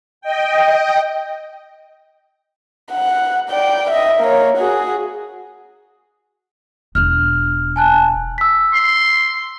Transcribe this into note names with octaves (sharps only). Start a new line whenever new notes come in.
D#5 G5
F#5
D5 G5
D#5 E5
A#3 C#5
F#4 G#4
E1 D4 F6
G#5 A5 F#6
E6 B6
C6